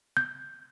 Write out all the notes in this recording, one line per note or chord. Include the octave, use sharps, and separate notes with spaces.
G6